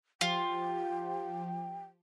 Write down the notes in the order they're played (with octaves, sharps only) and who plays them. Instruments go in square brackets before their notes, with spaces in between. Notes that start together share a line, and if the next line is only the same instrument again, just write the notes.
[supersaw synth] F3 G4 [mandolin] F4 [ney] G5